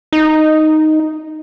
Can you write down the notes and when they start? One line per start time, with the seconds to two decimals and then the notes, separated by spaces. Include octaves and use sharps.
0.13 D#4